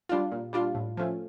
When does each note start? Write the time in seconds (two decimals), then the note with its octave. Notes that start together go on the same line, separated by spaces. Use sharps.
0.09 G3 D4 F4
0.32 A#2
0.53 G3 D4 F4
0.75 A2
0.97 F3 A3 C#4